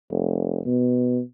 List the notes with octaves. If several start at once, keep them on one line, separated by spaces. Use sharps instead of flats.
F1
B2